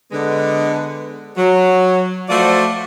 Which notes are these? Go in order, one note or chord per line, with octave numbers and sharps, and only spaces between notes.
D3 G#3 B3
F#3
F3 A3 F4 F#4 C5 D5